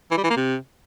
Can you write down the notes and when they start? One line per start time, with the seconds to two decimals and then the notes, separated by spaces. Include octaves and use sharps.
0.11 E3
0.17 G3
0.24 E3
0.30 A#3
0.37 C3